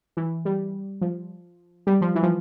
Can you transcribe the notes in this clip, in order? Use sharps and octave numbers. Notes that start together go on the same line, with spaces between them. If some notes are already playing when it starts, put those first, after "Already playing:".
E3
G3
F3
G3
F3
E3
F3